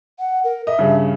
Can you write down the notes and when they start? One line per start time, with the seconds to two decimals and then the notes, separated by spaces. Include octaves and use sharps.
0.19 F#5
0.44 A#4
0.67 D#5 E5
0.79 G2 C#3